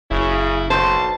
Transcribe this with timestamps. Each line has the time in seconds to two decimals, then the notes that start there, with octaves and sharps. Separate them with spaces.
0.11 F#1 C#3 E4
0.70 B1 C5 A5